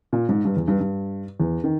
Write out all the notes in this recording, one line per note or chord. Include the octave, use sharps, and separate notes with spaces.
A#2
G#2
G2
E2
G2
G2
E2
D#3